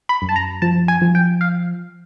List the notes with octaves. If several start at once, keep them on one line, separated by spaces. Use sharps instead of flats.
B5
F#2
A5
A#5
F3 A5
G#5
F3
G5
F5